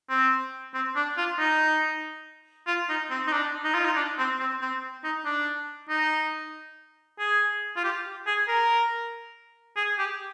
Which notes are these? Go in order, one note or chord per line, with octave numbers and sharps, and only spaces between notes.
C4
C4
D4
F4
D#4
F4
D#4
C4
D#4
D4
D#4
F4
D#4
D4
C4
C4
C4
D#4
D4
D#4
G#4
F4
G4
G#4
A#4
G#4
G4